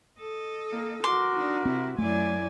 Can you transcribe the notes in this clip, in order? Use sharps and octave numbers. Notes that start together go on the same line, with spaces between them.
A4 D#5
A#3
F#4 A#4 C6 D6
D4 D#4
C3 C4 E4
F#2 A3 E4 D5 G#5